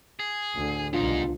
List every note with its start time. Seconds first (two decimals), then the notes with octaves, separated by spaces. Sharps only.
0.19 G#4
0.57 D2 A2 D3
0.93 C2 G#2 B2 D4 D#4 F4